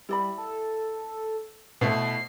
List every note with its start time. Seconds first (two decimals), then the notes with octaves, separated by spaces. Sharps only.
0.09 G3 E4 D5 B5
0.38 A4
1.81 B2 A3 E4 C5 F5 C7